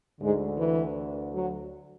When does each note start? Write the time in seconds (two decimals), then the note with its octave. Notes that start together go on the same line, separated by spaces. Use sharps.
0.20 D2 G#2 D3 G#3
0.58 E3
1.34 F#3